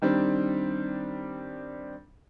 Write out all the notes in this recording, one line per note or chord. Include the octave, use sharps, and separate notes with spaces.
D#3 G3 C4 D4